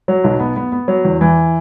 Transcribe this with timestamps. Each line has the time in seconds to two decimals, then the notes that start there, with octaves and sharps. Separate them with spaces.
0.08 F#3
0.24 B1
0.40 B3
0.56 B3
0.72 B3
0.88 F#3
1.05 E2
1.21 E3